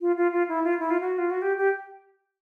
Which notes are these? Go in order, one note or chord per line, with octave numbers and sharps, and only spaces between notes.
F4
F4
F4
E4
F4
E4
F4
F#4
F4
F#4
G4
G4